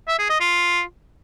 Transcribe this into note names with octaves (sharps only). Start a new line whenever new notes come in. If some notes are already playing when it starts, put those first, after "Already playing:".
E5
G#4
D#5
F4